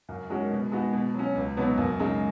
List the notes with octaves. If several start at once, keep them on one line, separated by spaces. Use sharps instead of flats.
F#2
D#3 G#3 C#4 F#4
B2
G#3 B3 D#4 F#4
B2
F#3 C#4
C#2
B2 F#3 B3 D#4
F#2
C#3 G#3 D#4